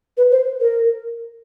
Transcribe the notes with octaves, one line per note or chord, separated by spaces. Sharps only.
B4
C5
A#4